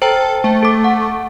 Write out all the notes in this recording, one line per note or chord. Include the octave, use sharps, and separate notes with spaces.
A4 C5 G5 A#5
A3
A4 D6
F#5